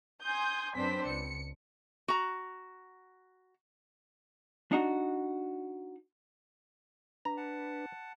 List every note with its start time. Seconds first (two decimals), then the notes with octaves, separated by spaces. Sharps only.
0.23 G#5 C6 D#6 G6
0.75 F#2 C4 D4 B4 C5 B6
1.07 C#2 C#7
2.08 F#4 A#5
4.72 D4 D#4 F#4
7.25 D4 B4 A#5
7.37 F#5 A5